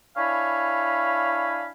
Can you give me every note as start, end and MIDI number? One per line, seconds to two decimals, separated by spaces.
0.16 1.70 62
0.16 1.70 64
0.16 1.70 73
0.16 1.70 77
0.16 1.70 80
0.16 1.70 83